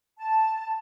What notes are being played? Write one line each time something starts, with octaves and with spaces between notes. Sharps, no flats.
A5